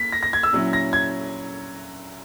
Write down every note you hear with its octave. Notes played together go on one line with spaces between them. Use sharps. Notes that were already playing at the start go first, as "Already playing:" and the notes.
Already playing: A#3 B6
A#6
A#6
G#6
E6
A#2 F#3 C#4 E4
A#6
G#6